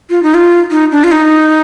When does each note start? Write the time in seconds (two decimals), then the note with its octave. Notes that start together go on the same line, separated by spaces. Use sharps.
0.10 F4
0.23 D#4
0.34 F4
0.71 D#4
0.92 D4
1.04 F4
1.12 D#4